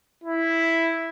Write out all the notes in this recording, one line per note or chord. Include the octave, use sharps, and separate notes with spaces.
E4